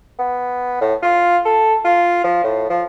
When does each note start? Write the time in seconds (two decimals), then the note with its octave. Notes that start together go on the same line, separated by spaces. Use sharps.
0.19 B3
0.81 A2
1.02 F4
1.45 A4
1.84 F4
2.24 F3
2.44 A2
2.70 F3